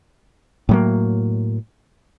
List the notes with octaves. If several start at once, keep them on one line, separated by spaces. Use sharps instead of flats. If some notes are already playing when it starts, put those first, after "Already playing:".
A2 F#3 A#3